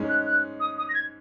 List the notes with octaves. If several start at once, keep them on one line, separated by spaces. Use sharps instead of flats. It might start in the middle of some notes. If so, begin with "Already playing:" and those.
Already playing: G#2 G#3 C#4
F#6
F#6
D#6
D#6
A#6
G#6